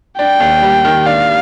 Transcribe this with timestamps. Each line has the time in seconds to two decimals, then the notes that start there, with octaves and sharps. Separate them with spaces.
0.18 D4 G5
0.40 D#2
0.63 G3
0.85 D#3
1.06 D4 F5